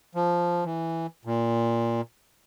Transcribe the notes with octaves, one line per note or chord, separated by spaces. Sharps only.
F3
E3
A#2